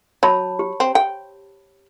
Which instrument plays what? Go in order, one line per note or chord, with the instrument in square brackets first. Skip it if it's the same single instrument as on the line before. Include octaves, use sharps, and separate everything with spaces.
[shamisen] F#3 [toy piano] C#5 A5 B5
[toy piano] G4
[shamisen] C4
G5